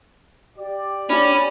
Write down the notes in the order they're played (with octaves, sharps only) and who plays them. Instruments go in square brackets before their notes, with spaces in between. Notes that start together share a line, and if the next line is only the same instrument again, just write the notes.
[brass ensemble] G4 D5
[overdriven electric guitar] C#4 [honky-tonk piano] D4 [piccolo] B5